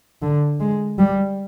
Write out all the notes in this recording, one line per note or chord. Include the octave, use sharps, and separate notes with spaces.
D3
G#3
G3